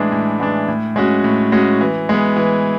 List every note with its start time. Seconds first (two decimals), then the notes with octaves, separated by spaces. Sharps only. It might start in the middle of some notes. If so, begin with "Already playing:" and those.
Already playing: A2 E3 G#3 D4
0.12 A2
0.40 E3 G#3 D4
0.68 A2
0.96 G#3 C#4 F#4
1.24 A2
1.52 G#3 C#4 F#4
1.81 E3
2.09 G#3 B3
2.37 E3